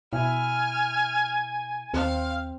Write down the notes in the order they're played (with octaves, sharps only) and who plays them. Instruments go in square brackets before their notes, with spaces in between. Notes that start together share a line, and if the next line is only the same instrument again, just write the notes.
[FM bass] B2 [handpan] E4 [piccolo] G#5 [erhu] F6
[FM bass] D#2 [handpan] C4 [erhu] F5